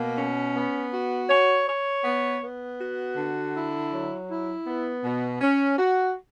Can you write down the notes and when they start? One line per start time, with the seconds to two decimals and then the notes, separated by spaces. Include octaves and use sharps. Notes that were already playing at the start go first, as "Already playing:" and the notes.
Already playing: B2 A#3
0.17 C#4
0.54 B3
0.92 F#4
1.29 C#5
1.68 C#5
2.04 B3
2.42 B3
2.80 F#4
3.17 D3
3.54 E4
3.92 F#3
4.29 E4
4.67 B3
5.04 B2
5.41 C#4
5.78 F#4